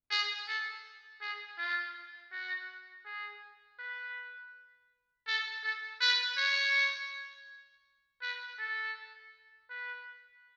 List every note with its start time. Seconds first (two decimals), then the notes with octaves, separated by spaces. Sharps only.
0.10 G#4
0.47 A4
1.21 G#4
1.58 F4
2.32 F#4
3.05 G#4
3.79 B4
5.27 A4
5.63 A4
6.01 B4
6.37 C#5
8.22 B4
8.59 A4
9.70 B4